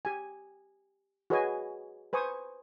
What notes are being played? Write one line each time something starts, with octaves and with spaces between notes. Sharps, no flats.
G4 G#5
F#4 G#4 B4 C#5 D#5 G#5
B4 C5 G#5 C#6 D#6